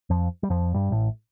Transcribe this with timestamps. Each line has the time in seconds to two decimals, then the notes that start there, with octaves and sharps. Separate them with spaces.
0.10 F2 F3
0.43 G3
0.50 F2 F3
0.74 G2 G3
0.91 A1 A2